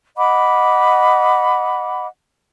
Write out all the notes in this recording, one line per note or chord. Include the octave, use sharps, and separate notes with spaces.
D#5 F#5 B5 D6